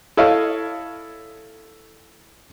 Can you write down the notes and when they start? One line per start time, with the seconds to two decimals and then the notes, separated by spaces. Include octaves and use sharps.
0.17 E4 A4 C#5 D#5 F5